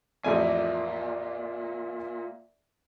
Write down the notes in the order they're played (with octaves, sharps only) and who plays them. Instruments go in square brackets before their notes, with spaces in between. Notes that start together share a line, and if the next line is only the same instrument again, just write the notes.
[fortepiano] A1 F2 G#5 [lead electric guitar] A#2 [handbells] D5 E5